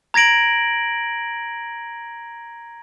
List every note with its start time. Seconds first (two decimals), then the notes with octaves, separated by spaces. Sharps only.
0.14 A#5 G#6 A#6 D7 F#7